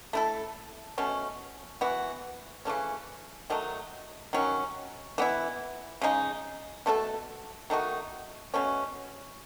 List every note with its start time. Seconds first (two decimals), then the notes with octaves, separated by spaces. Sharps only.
0.13 A3 E4 A4
0.98 B2 A3 C#4
1.81 E3 B3 F#4
2.65 C#3 E3 A3 C#4
3.50 D#3 F#3 A3 D#4
4.33 D#3 F#3 C#4
5.18 E3 B3 E4
6.01 C#3 G#3 D#4
6.86 B2 A3 E4 A4
7.70 D#3 A3 D#4 F#4
8.54 B2 A3 C#4